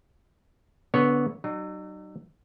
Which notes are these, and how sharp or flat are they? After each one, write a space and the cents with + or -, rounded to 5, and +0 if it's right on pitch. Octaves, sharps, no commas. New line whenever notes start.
D3 -20 B3 -5 C#5 +0
F#3 +40 D#4 -35